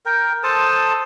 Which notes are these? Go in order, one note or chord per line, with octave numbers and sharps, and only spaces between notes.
A#4 G5
A4 C5 A5 D#6